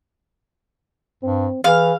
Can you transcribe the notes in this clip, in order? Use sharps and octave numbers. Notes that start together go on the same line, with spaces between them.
G2 C4
E3 G#4 F5 F6